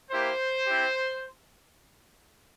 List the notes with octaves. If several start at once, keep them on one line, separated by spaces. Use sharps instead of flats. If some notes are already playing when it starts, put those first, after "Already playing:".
A#3 E4 G4 C5
C4 E4 G4